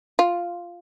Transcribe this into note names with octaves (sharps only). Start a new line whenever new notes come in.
F4